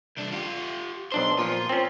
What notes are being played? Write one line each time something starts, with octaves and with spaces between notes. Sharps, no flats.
C2 D4
F4 G4
B1 D4 C5 C6
A#2 F3 F4
C4 C#4